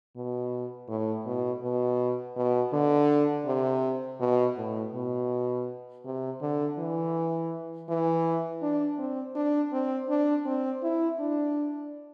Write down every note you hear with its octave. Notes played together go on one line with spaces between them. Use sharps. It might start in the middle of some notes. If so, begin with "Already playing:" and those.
B2
A2
B2
B2
B2
D3
C3
B2
A2
B2
C3
D3
E3
E3
D4
C4
D4
C4
D4
C4
E4
D4